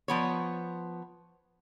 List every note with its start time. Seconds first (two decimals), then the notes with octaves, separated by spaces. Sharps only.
0.08 F3 B3 C#5